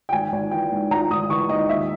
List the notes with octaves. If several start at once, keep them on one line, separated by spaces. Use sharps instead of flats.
G5
G#1 G#5
G#1
E3 G5
G#2
G#1 A#5
G#1 D#6
E3 C#6
G#2 D#5
D#2 E5